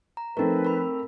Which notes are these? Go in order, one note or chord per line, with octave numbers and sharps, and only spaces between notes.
A#5
F3 A3 C4 D#4 A#4 B4
A#4 B5